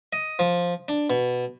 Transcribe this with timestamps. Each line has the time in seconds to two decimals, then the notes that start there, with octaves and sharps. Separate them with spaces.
0.13 D#5
0.39 F3
0.88 D4
1.10 B2